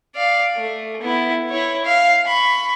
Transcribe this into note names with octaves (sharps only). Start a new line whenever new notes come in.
D5 F5
A3
B3 E4
E4 C#5
F5
B5 C#6